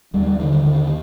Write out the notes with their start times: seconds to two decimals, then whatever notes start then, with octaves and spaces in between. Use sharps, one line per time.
0.13 D#2 G3
0.26 G3
0.39 D3 D#3
0.52 D#3
0.65 D#2 D#3